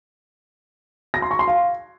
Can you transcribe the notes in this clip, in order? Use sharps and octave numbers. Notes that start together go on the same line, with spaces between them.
A#6
C6
C#6
C6
F5